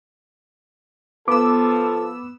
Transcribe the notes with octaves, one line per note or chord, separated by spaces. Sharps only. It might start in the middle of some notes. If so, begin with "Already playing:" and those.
F3 B3 A4 D6 E6